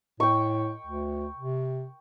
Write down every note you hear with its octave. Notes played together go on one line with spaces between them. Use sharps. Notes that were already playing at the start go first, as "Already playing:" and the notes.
A2 G5 C#6
D2
C3